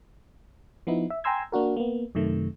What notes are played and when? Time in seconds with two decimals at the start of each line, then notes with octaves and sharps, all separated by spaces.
0.87 F3 B3 D#4 E4
1.10 E5
1.24 G5 G#5 A#5 C6 E6 G#6
1.52 A#3 D4 F#4 A#4
1.77 A#3 B3
2.15 F#2 C3 D#3 A3